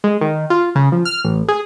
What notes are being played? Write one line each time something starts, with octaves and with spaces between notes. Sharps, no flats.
G#3
D#3
F4
C#3
F3
F6
A1
G#4